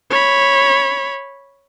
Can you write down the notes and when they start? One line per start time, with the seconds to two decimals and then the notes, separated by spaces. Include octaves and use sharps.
0.10 C#5 B5